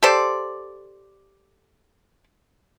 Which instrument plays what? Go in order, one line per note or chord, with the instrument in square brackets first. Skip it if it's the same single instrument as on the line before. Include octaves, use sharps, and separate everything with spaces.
[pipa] G4 A4 C5 D5